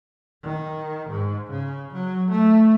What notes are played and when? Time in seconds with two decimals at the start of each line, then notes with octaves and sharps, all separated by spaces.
0.43 D#3
1.10 G#2
1.51 C#3
1.93 F#3
2.31 A3